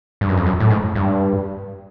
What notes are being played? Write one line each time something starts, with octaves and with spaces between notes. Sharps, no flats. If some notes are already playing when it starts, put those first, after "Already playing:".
G2
F#2
F2
F#2
A2
G#2
G2